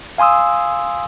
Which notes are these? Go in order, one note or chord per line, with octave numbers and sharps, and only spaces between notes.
F5 G#5 C6 D#6 E6